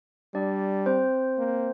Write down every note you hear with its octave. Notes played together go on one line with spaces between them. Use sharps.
G3 D4 D5
C4 C5
A#3